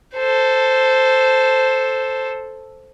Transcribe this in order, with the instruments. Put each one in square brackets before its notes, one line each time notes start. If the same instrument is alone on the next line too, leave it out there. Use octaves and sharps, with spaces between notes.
[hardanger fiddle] A4 C5